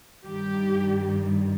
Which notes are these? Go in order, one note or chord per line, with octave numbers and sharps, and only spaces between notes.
G2 D#3 G3 G4